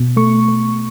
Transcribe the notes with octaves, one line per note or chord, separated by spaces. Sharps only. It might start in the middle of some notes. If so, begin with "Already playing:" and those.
Already playing: B2
A3 C#6
A3